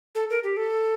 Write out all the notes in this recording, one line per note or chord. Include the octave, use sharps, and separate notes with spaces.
A4
A#4
G4
A4